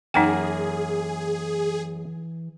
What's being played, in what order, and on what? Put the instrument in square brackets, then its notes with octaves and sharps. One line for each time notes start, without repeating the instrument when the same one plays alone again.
[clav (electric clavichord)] F#2 A#3 A5 [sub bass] E3 [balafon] D#4 F#5 G5 [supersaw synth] G#4